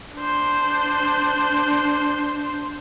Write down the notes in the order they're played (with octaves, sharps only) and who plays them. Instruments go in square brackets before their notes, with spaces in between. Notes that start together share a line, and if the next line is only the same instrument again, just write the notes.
[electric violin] D4 C5